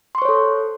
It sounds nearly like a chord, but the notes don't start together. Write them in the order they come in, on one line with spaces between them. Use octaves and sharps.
C6 C#6 C5 C#5 A4